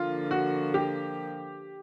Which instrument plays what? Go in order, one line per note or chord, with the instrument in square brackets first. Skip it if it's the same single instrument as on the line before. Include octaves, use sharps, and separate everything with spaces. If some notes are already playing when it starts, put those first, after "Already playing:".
Already playing: [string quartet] D3 F3 A#3 [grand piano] F4
[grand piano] F#4
G4